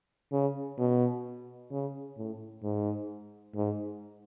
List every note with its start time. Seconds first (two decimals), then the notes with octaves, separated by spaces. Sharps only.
0.32 C#3
0.78 B2
1.71 C#3
2.17 A2
2.63 G#2
3.55 G#2